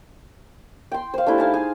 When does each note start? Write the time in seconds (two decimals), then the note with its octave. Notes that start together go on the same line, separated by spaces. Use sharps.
0.92 G5 C6
1.14 C5 F5
1.27 A3 D4 E4 G4
1.38 D#4 F5 G#5 A5
1.54 G#4